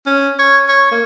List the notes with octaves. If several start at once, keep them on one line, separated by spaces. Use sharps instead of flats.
C#4
C#5
C#5
A#3